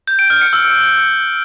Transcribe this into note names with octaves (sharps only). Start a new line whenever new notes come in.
G6
D7
F6
C#7
E6